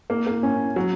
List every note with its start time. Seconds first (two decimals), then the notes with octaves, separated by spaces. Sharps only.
0.10 A#3
0.27 A#3
0.43 C#4
0.76 F#3